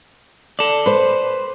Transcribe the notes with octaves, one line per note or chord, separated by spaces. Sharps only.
A4 D5
B4 C5